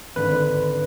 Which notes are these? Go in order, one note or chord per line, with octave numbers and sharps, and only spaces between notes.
G#1 D3 B4